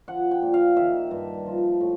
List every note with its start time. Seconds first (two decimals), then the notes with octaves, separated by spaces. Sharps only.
0.08 F3 F#5
0.31 G5
0.42 A#2
0.54 F5
0.77 D#3 E5
1.11 G2
1.46 F3
1.80 A2